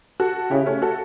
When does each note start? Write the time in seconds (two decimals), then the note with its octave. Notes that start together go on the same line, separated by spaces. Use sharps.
0.20 F#4 A4
0.51 C#3 E4 G4
0.66 A3 C#4
0.82 F#4 A4